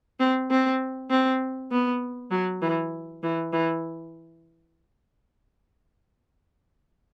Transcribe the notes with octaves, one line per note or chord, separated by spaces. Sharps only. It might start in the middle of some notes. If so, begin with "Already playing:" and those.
C4
C4
C4
B3
F#3
E3
E3
E3